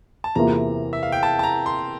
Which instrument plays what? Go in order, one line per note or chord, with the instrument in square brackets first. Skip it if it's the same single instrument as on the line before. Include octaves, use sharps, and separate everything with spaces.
[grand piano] A5
[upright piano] E2 C3 E3 A#3 F4 [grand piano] A#5
[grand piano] E5
F5
G5
A5
A5
A#5
C6